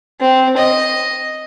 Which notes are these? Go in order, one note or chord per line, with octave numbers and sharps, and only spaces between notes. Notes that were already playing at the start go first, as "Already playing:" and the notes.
C4
D#5